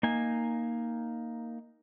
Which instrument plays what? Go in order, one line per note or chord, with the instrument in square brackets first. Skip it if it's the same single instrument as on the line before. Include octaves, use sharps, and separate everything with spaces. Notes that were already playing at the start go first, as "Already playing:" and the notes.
[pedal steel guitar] A#3 D#4 G#5